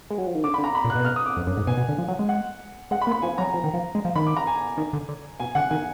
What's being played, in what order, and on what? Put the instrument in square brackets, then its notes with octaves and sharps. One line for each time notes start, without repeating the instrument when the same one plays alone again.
[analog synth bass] G#3
F#3
F3
D#3
[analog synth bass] D3 [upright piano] D6
[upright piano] B5
[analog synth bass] D3
[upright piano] A#5
B5
[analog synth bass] A#2
[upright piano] F#6
[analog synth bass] B2
[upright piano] F6
D#6
D6
[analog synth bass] F2
F#2
G#2
[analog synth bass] B2 [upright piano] G#5
[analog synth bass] B2
D3
F3
F#3
G#3
[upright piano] F#5
[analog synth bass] G#3 [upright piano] F#5
[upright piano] B5
[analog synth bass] A#3
[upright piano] B5
[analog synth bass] F3 [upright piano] G#5
[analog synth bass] F#3 [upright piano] A#5
[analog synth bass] F3
D#3
F3
G#3
F3
[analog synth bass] D#3 [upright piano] B5
[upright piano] D6
A#5
G#5
[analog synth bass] D#3
D3
D3
[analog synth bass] B2 [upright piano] G#5
[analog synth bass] D3 [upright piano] F#5
[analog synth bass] D#3 [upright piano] G#5